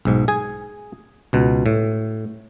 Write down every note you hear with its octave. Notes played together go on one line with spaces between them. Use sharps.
B1 G#2
G#4 G#5
C#2 B2
A2